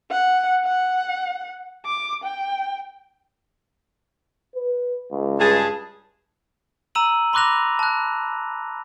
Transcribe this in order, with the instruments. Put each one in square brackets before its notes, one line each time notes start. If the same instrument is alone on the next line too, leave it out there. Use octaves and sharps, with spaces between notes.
[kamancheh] F#5
F#5
D6
G5
[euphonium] B4
C#2
[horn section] G2 G#4 A5
[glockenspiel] A#5 E6 D#7 F#7
B5 C6 D6 F#6 A#6 F7
A5 F#6